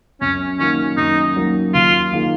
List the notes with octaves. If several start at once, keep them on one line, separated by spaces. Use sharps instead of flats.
F#2 C#4
D#3 F#3 A#3 C#4
F#2 D#4
D#3 F#3 A#3
D#2 F4
D#3 A#3 F4 G#4